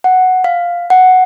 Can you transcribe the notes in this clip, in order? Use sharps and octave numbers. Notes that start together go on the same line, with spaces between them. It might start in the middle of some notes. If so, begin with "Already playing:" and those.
F#5
F5
F#5